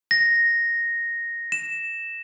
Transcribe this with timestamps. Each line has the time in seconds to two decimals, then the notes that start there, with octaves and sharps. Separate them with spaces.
0.11 A#6
1.52 E7